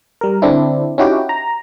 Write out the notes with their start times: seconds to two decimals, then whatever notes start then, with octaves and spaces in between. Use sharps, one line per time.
0.21 G3 A#4
0.42 D3 C4 D4 E4
0.98 C#4 D#4 E4 F#4 G4 G5
1.29 A#5